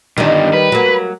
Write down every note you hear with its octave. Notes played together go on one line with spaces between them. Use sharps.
G2 D3 D#3 G3
B4
F#3 A#3